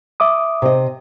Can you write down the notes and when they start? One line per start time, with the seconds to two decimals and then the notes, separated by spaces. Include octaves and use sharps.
0.20 E5 D6 D#6
0.62 C3 D#5